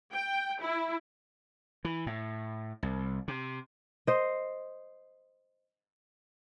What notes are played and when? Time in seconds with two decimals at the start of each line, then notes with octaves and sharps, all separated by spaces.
0.13 G5
0.62 E4
1.85 E3
2.07 A2
2.83 C2
3.28 C3
4.07 C5 D#5